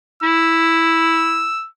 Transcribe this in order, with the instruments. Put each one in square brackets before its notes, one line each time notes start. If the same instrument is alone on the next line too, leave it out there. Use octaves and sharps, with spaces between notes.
[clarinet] E4 [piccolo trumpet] E6